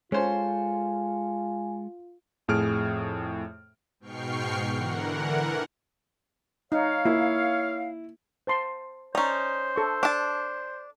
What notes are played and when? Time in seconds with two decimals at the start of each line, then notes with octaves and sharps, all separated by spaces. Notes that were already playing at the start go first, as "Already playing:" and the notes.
0.12 G#3 C#4 F4 A4 C5 G#5
2.48 F2 A2 G#4 F6 D7
4.00 G#2 B2 G5 C#6 F6 C7
4.74 D3 E3 A#4 F#5
6.72 D#4 C#5 F5
7.05 A#3 E4
8.47 C5 A5 C6
9.15 C#4 D#4 C5 D5 A#5
9.76 A4 C#6
10.03 D4 A5